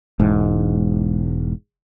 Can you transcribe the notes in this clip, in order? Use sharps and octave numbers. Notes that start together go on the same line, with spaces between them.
E1 G#2